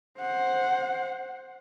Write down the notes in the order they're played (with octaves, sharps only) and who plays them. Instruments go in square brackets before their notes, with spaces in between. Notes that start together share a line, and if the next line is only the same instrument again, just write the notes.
[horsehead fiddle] C5 F#5